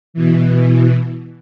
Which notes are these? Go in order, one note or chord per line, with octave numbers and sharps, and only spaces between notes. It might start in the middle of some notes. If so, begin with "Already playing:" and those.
B2 E3